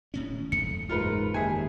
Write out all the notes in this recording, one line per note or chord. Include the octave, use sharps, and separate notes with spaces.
D#1 A2 C#4
F#1 E2 A3 C#7
G#2 F4 A#4 B4
D#2 G#4 E5 G#5